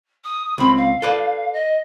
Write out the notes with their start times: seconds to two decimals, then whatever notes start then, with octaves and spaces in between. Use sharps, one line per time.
0.24 D#6
0.58 C#2 C4 B5
0.77 F5
1.02 A4 B4 D5
1.53 D#5